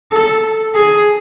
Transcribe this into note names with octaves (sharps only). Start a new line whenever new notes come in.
A4
G#4